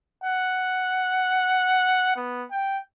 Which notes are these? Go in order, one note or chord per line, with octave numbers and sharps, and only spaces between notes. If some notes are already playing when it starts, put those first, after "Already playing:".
F#5
B3
G5